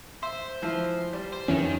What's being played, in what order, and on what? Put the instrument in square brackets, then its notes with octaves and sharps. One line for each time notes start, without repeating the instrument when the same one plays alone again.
[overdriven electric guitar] C5 [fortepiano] E5
[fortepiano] E3 F3 E4
G3
[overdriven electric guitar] C5
[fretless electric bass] F2 E3 C#4 [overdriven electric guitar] D#3